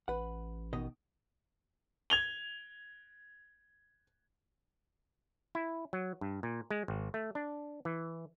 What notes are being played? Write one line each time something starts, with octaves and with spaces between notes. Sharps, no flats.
A1 B4 F#5
B2 D#3 D#5
G#6 F7 G7
E4
F#3
G2
A#2
G#3
G#1
A3
D4
E3